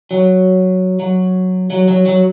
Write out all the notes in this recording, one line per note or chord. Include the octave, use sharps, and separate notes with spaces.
F#3
F#3
F#3
F#3
F#3